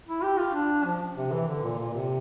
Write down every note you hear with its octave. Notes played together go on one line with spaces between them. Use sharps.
E4
G4
F4
D4
F3
C3
E3
D3
A#2
A#2
C3